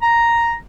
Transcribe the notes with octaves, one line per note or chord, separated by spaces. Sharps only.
A#5